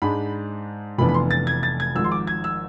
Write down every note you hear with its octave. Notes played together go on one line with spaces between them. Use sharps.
G#2 G#3 D4 B5
F1 F2 E3 B3 D4 B5
B5
C6
A6
G#6
A6
G#6
G#1 G#2 F3 E6
C6
D6
G#6
E6